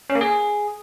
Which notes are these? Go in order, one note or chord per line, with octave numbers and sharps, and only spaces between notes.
C#4
A#3
G#4